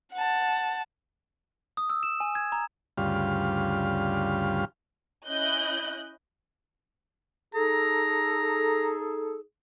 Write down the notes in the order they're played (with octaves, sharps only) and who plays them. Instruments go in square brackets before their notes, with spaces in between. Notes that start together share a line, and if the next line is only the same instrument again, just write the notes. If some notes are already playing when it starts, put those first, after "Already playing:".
[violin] F#5 A5
[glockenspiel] D#6
E6
E7
G#5
G#6
A#5
[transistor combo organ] D2 G2 C#3 G3 F4 F5
[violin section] C#4 E4 D#5 F#6 G6
[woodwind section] D#4 G#4 A4 [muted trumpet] A#5